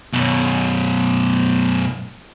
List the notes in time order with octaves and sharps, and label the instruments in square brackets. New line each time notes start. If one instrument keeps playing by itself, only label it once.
[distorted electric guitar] F#2 B2